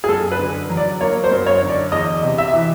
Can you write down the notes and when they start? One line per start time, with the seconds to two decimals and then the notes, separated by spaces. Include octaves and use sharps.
0.04 G#4
0.09 F#2 A4
0.32 B4
0.39 D3
0.70 F#3
0.77 D5
1.00 A#3 C#5
1.24 C5
1.31 F#2
1.46 C#5
1.62 D3
1.69 D5
1.92 E2 D#5
2.23 C3
2.38 E5
2.54 E3